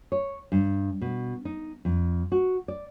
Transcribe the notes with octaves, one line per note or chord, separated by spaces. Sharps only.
C#5
G2
B2
D#4
F2
F#4
D5